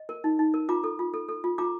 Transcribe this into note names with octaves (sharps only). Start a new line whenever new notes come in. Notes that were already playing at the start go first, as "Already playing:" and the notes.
Already playing: D#5
A#4
D#4
D#4
A#4
F4 A#5 D6
A4
F4
A4
A4
F4
F4 A#5 D6